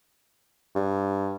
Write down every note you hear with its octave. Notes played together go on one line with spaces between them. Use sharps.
G2